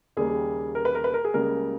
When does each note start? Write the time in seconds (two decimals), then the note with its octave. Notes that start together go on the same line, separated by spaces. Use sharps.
0.17 D#2 C#3 G3 A#3 G#4
0.75 A#4
0.85 B4
0.95 A#4
1.04 B4
1.14 A#4
1.25 G#4
1.34 C#2 C#3 G3 A#3 A#4